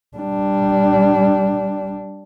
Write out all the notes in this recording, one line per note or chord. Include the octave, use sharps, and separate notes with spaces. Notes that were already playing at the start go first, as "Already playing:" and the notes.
G3 D4